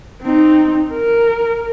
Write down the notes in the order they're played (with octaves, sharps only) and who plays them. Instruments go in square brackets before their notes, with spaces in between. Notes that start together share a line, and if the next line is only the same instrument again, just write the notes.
[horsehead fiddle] C4 D#4
A#4